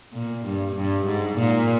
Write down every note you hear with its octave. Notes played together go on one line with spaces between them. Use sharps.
A#2
G2
G2
G#2
A#2